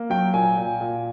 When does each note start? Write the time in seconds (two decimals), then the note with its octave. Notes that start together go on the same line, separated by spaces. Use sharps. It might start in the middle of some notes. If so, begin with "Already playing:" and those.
Already playing: A#3
0.10 F#3 G5
0.34 A#2 G#5
0.58 A#2
0.81 A#2